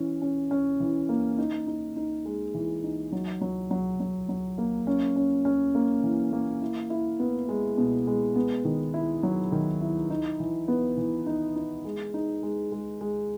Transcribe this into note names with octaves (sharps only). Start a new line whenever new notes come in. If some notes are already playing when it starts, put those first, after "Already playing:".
Already playing: E3 C#4
C#4
C#4
E3
A#3
D#4
D#4
D#4
G#3
E3
D#4
F#3
F#3
F#3
F#3
F#3
A#3
C#4
C#4
C#4
A#3
E3
A#3
E4
E4
B3
G#3
B2
G#3
B3
D#3
E4
F#3
D#3
E4
D#4
E3
B3
E3
D#4
D#4
G#3
D#4
G#3
G#3
G#3